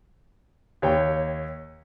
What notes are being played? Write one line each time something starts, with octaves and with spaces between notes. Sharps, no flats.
D#2 C#5 G5